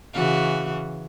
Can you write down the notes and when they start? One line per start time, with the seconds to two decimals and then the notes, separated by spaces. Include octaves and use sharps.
0.14 C#3 E3 F#4